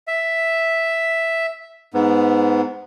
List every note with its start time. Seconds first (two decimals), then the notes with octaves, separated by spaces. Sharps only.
0.08 E5
1.94 G#2 B3